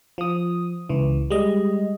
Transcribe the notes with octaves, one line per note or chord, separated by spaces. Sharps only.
F3 D#6
C#2 E3
G3 G#3 D#5